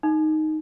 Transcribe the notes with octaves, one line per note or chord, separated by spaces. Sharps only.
D#4